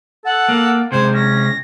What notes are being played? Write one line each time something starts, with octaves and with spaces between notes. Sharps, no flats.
A4 F#5
A#3
C3 G#3 C5 G#6
C#4 A#6